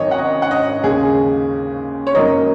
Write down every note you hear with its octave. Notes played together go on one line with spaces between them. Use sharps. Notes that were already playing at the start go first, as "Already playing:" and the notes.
Already playing: G#1 F#2 D#3 F#3 C#5 D#5
F#5
D#5
F#5
D#5
D#2 C#3 G#3 G#4
C#5
F#2 D#3 F#3 A#3 D#5